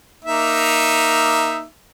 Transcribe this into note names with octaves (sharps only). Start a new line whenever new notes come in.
A#3 D#4 E5